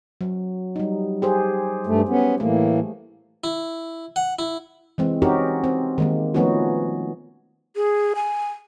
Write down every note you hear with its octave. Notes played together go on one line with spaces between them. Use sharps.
F#3
G3 D#4
G4 G#4 C5
G2 A3
B3 C#4
A2 E3 A3 A#3
E4
F#5
E4
E3 G#3 C4
C4 C#4 D#4 F#4 G4 A#4
C4
D#3 G#3 A#3
F3 A3 B3 C#4 D#4 F#4
G#4
G#5